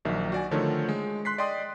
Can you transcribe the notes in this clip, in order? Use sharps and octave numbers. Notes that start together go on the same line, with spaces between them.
A#1 D#3 F#3 E5
F#4 D5 G#5
D3 D#3 F3 A3 A4 C#5
G#3
C6 F#6 B6 C7
D5 D#5 G5 C6 D#6